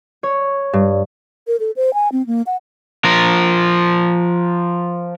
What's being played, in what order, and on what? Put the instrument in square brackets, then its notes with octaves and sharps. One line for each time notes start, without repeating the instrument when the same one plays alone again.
[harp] C#5
G2
[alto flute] A#4
A4
C5
G#5
C4
A#3
F#5
[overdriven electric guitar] F3 A#4